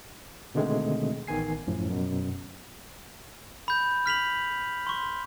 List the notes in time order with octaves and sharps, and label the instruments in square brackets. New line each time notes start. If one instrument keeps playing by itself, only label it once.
[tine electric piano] B2 D3 D#3 G#3 A3 C4
A1 D#3 B3 G#5 C7
F#2 A2 F3
F#2 B2
[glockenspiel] B5 G6
F6 B6 F7 F#7
C6 C#6